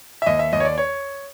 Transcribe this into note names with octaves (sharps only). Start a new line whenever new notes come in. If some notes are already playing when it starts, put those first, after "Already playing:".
E5
D#2 D#5
E5
D#2 D#5
C#5
D5
C#5